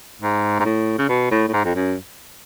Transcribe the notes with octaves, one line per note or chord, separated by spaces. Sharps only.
G#2
G#2
A2
C#3
B2
A2
A2
G#2
F2
F#2